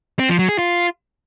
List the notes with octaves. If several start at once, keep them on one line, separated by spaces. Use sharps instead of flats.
C4
F3
F#3
G#4
F4